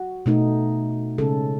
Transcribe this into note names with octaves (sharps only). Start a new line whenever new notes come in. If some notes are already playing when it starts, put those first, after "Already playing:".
Already playing: F#4
B2 A3 D#4
C#3 G#3 C#4 A4